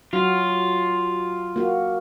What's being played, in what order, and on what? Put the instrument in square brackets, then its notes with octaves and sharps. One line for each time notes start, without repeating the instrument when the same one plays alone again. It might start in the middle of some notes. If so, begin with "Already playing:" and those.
[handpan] F#3 F#4 [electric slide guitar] F4
[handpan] A#3 F#4